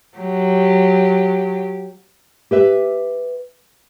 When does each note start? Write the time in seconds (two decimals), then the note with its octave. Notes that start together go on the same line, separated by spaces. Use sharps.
0.18 F#3 G4
2.51 G4 B4 E5